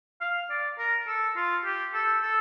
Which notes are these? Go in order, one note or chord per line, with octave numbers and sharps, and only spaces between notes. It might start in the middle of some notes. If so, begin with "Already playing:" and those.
F5
D5
A#4
A4
F4
G4
A4
A4